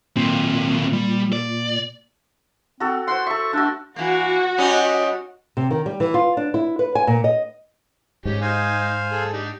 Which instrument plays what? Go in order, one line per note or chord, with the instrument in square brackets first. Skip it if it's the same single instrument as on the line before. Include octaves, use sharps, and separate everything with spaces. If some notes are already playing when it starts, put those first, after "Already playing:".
[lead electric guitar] D#2 C4 [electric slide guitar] A#2
[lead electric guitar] G3
D5
[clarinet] C4 [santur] F#4 A4
[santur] C5 F#5 [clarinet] C6
[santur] A4 E5 [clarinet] C#6
[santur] A3 F#4 [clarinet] D4
[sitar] E3 A#3 [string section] F#4
[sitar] G3 C#4 D#4
[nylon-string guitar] C3
D#3
G3
E3
F4
D4
E4
B4
G#5
A#2
D#5
[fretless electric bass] G#2 [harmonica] C#4 G4
[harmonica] D#4 [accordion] C5 F5 G#5
[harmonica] G#4 A4
D4 D#4 G4